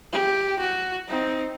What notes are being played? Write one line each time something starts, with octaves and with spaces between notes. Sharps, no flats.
G4
F#4
C4 D#4